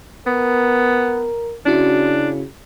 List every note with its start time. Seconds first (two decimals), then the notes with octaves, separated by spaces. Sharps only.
0.27 B3 A#4
1.66 C#3 C#4 D4 E4 F#4